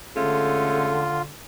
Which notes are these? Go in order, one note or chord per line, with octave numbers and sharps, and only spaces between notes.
D3 G#3 A3 C#4 F4